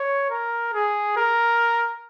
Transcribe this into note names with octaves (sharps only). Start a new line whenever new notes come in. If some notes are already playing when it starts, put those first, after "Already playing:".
Already playing: C#5
A#4
G#4
A#4